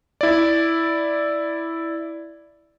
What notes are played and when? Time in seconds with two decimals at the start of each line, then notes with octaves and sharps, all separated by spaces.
0.21 E4 D5